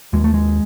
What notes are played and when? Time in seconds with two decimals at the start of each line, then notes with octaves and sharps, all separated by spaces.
0.13 D#2 G#3
0.24 A3
0.34 G#3